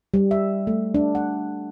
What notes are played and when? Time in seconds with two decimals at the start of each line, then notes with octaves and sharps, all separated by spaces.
0.14 G3
0.31 E5
0.67 A3
0.94 D4
1.15 F#5